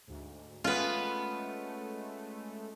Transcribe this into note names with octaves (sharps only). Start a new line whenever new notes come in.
D2 G#2
G#3 A3 B3 C#4 F4 B4